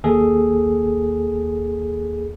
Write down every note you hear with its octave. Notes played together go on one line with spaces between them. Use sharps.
D#2 G#4 A4